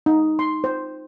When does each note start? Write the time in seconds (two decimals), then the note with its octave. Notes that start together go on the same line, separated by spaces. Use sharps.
0.06 D#4
0.39 C6
0.64 C5